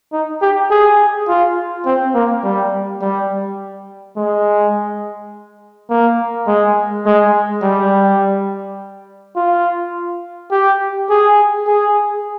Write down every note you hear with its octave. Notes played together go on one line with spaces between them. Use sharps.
D#4
G4
G#4
F4
C4
A#3
G3
G3
G#3
A#3
G#3
G#3
G3
F4
G4
G#4
G#4